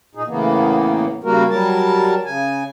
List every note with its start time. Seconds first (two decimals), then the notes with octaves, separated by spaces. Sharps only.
0.15 A#2 D#4 G#4
0.27 A2 C#3 E3 A#3 B3
1.24 C#3 G3 A#3 F#4 A#4
1.50 F#3 G3 A#4 A5
2.25 C#3 G#5